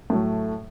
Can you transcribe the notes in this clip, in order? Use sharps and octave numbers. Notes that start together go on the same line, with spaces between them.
A2 F#3 A3